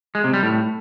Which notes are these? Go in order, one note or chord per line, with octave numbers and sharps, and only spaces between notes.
G#3
C3
G3
A2